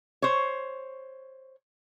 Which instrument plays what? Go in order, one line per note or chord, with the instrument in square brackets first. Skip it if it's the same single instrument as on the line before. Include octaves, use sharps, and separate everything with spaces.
[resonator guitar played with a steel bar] C5 C#5